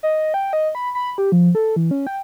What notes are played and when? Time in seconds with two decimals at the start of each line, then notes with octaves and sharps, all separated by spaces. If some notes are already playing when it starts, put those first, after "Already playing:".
0.03 D#5
0.34 G5
0.53 D#5
0.75 B5
0.95 B5
1.18 G4
1.32 F3
1.55 A4
1.76 E3
1.91 C#4
2.07 G5